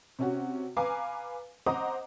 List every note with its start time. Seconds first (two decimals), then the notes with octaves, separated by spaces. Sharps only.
0.19 C3 C#4 F#4
0.77 B4 F5 G#5 A#5 D6
1.66 C5 D#5 F#5 A#5 D6 D#6